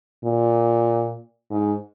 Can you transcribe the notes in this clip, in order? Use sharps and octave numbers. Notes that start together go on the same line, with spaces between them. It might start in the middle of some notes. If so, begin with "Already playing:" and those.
A#2
G#2